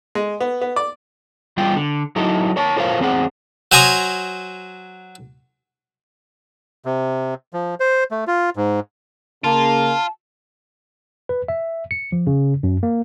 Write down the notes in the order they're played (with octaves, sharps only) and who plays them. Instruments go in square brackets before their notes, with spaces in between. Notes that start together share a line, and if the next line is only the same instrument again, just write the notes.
[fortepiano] G#3
B3
B3
D5
[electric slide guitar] E2 G3 F4 G5
D3
F#3 D#4 E4 A4
A#4 C#5 A5
F4 A4 A#4 C5 C#5 F5
E2 C4 G#4 F#5
[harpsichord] F#3 C5 G#5 A#5 D#6
[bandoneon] C3
F3
C5
A3
F4
G#2
[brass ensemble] C#3 A#3 [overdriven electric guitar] F4 [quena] A5
[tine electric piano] B4
E5
C#7
F3
C#3
F#2
A#3